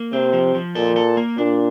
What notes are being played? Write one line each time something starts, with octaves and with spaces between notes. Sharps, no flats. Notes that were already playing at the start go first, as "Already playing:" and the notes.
Already playing: A#3
C3 C4
F3
F3
A#2 A4
A4
A#3
A#2 D4